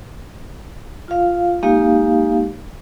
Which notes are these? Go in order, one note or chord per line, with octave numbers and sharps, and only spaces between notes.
F4 F5
G#3 A#3 D#4 G4 F5